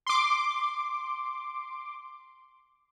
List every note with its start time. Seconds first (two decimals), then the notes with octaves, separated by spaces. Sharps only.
0.07 C6 D6